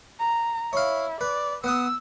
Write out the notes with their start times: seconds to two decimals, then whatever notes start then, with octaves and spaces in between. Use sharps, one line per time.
0.20 A#5
0.73 E4 C#5 F5
1.21 B4 D5
1.64 B3 F#5 D#6 E6